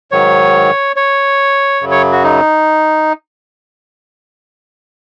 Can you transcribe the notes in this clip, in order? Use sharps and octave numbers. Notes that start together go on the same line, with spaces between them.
G#2 D#3 F#3 C#5
C#5
F#2 C#3 F#3
C#5
F#4
D#4